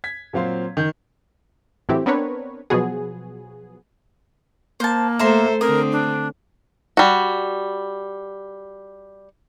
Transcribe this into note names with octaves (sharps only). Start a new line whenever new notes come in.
G#6 B6
A#2 F#3 C4 F5 C6
D#3 G6
A2 E3 F#3 C4 E4 G4
B3 C4 D4 A#4 B4 C#5
B2 F3 F#3 B3 F#4 G#4
A#3 C5 A5
A3 A4 C5 E5 A#5 C6
D3 C4 A#4 D#6
D4
G3 F#4